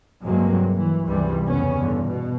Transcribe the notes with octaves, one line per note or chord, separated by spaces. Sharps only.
G2 C3 F#3 G#3 A#3 C4
E3
C#2 G2 C3 E3 G3
F2 C#3 B3 C#4
E2 G2 D3
B2